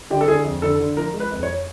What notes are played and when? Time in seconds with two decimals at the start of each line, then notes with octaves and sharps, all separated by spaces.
0.10 D3 G4
0.21 A4
0.28 D3 G#4
0.45 F2
0.62 D3 A4
0.80 D3
0.97 F3 A#4
1.14 G#3
1.20 B4
1.32 F2
1.43 C#5